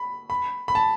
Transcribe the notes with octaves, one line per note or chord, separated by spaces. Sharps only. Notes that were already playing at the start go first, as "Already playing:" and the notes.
Already playing: B5
B5
B5
A5